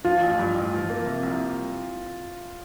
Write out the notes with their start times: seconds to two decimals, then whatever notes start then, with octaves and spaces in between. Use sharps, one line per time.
0.05 F3 F4
0.22 A1
0.39 G2
0.55 A1
0.73 F3
0.90 A#3
1.06 C3
1.23 C2